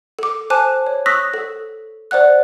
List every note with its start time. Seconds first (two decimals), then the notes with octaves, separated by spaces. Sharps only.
0.19 A4 D6
0.50 C5 G#5 A5 D6 F#6
0.87 C#5
1.06 C#6 D#6 E6 F#6 A#6 B6
1.34 A4
2.11 C5 D5 F#5 F#6